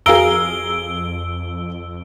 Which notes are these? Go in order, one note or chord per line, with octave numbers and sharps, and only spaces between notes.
F2 G#4 F5 A#5 E6 D7 G7